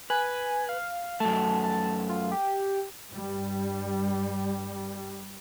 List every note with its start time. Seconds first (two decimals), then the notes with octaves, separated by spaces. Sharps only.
0.10 B4 G#5
0.69 F5
1.20 F#2 A3 A5
1.64 A5
2.09 F4
2.32 G4
3.12 G2 G3